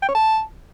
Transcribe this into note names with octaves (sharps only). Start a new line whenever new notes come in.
G5
C#5
A5